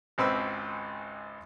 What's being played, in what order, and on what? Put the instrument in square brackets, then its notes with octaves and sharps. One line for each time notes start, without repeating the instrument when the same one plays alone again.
[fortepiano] G#1 C#2 C4 B4 B5 E6